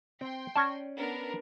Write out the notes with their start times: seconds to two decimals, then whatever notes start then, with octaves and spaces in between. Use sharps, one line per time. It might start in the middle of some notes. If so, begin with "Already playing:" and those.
0.21 C4 G5 C6
0.56 C#4 D5 A5 C#6 A#6
0.97 B3 D4 A#4